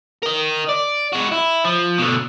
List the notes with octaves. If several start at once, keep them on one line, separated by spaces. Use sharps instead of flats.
A#4 D#5
D5
G#3 F#4
E4
F3
B2 D3